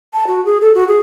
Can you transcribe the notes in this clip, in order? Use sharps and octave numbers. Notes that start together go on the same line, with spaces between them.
A5
F#4
G#4
A4
F#4
G#4